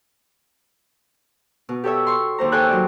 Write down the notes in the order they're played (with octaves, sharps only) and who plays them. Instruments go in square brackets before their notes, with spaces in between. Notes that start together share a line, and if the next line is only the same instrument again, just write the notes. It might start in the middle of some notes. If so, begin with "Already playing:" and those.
[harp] B2
G4 A4 C#5 E5
C6 C#6
D#2 C5 A#5
A4 C#5 G5 G#5 C6 F#6
F#3 D5